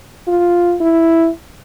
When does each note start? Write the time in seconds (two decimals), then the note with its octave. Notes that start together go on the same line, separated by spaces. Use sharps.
0.28 F4
0.81 E4